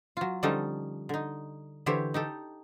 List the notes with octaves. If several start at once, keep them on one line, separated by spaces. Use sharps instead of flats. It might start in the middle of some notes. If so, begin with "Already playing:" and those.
F#3 F4
D3 F3 G3 C#4 D#4 A4
D3 D#4
D3 E3 G4 C5 C#5 E5
D#4 G4 A4